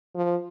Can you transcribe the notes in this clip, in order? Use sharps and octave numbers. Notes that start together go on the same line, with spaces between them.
F3